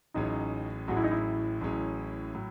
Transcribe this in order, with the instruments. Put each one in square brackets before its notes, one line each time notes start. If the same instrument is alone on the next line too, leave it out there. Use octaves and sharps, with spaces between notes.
[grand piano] A1 A2 F#3 C#4 G#4 [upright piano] D#4
[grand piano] A1 A2 F#3 C#4 G#4 [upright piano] F#4
[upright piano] E4
D#4
E4
[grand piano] A1 A2 F#3 C#4 G#4
A2 F#3